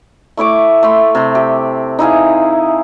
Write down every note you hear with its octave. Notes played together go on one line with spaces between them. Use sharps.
A3 E4 C#5 D6
A3 B5 C6
C3 C6
G4
D#4 E4 G#4 F5